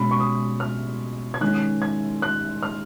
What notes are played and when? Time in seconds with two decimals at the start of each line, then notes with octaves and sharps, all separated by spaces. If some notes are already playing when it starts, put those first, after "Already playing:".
Already playing: B2 G#3 C#4 B5
0.11 C#6
0.20 D#6
0.60 F6
1.34 G#6
1.41 D#3 G#3 C#4 F#6
1.82 G#6
2.22 F#6
2.63 F6